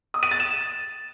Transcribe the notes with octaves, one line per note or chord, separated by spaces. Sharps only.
D#6
D#7
A6
E7